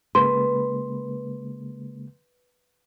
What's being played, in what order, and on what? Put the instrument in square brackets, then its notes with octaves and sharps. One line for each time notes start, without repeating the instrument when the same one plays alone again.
[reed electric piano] C#3 G#3 A#3 [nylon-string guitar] B4 [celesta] C6